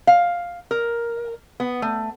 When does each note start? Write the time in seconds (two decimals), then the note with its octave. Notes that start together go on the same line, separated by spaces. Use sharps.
0.07 F5
0.71 A#4
1.60 B3
1.82 A3